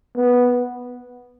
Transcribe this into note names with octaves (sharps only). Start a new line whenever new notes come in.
B3